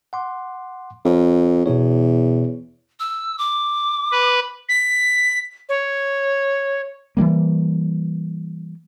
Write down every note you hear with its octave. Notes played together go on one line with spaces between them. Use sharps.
F#5 C6 D6
F2 C#5
E2 B2 C#5
E6
D6
B4
B6
C#5
E3 F#3 G3 A#3